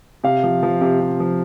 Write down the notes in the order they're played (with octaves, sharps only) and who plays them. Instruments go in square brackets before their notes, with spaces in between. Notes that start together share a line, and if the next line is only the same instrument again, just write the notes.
[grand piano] C3 F5
F3
F3
C3
C3
F3